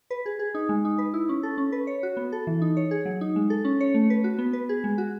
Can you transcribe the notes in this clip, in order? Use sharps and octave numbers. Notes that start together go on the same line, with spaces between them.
B4
G#4
G#4
D#4
G#3
D#4
B4
E4
C#4
A4
C#4
B4
C#5
F#4
B3
A4
E3
D#4
C#5
G#4
F#3
D#4
G#3
A4
C#4
C#5
A3
B4
F#4
B3
B4
G#4
G#3
F#4